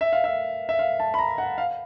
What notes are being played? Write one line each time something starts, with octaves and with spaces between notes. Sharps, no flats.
E5
F5
E5
E5
F5
A5
B5
A#5
F#5
F5